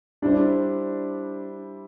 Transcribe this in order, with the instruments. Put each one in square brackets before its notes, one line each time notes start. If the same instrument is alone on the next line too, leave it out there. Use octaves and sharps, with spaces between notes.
[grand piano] G3 E4 C5 [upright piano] D4